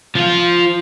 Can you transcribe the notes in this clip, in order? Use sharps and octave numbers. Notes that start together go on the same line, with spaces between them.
F3 F4